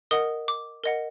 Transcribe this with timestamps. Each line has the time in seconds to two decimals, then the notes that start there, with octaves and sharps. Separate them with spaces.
0.11 A#4 D#5 F#5 D#6
0.48 D6
0.84 A#4 D#5 F#5